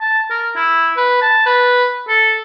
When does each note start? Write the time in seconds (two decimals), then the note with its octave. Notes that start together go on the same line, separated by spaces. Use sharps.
0.01 A5
0.30 A#4
0.56 E4
0.97 B4
1.22 A5
1.46 B4
2.08 A4